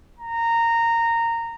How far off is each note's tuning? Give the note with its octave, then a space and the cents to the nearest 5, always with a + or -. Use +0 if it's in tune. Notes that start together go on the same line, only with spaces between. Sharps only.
A#5 -15